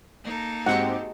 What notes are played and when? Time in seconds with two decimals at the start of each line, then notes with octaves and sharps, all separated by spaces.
0.24 A#3 D#4 A4
0.66 G#2 G#3 C4 F#4 G4 F#5 C#6